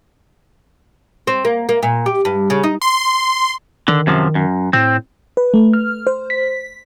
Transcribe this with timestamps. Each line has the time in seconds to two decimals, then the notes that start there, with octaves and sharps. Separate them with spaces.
1.27 C4
1.45 A#3
1.69 A#3
1.83 A#2
2.06 G4
2.25 G2
2.50 C#3
2.63 D#4
2.82 C6
3.88 D3 D#3
4.07 F#2 C3 F3
4.35 F#2
4.73 A2 C4
5.37 B4
5.54 A3
5.73 F6
6.07 C5
6.30 B6